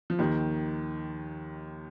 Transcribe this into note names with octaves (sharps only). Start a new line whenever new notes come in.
F3
D#2 D#3